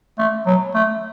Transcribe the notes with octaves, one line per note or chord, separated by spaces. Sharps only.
A3
F#3
A3